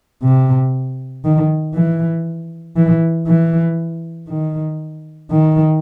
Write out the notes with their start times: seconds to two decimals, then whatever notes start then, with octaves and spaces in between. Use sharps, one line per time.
0.23 C3
1.25 D#3
1.75 E3
2.77 E3
3.28 E3
4.29 D#3
5.31 D#3